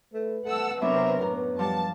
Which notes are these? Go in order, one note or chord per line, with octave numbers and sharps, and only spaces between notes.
A3 B4
A3 F#5 A5 E6
C3 F#3 B3 C4 D4 A#4 E5
F#2 A2 B3 A#4
F3 G3 A5